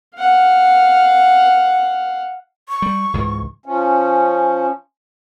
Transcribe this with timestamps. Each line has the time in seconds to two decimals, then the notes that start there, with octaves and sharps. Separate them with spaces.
0.15 F5 F#5
2.69 C#6
2.82 G3
3.14 C#2 G#2 E3
3.66 F3 C#4